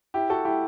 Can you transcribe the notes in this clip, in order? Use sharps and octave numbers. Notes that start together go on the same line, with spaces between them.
E4 G4
F#4 A4
E4 G4